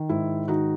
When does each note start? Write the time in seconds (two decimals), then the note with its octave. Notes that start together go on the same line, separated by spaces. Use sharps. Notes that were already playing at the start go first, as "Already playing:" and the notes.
Already playing: D#3
0.09 G#2 E4
0.48 D#3 D#4 F#4